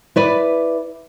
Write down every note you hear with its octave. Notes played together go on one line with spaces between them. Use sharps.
E4 B4 D5